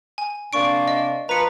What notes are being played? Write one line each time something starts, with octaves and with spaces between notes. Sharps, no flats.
G#5
C3 A#3 D4 C#6 D7
D#5
F3 B4 A#5 C#7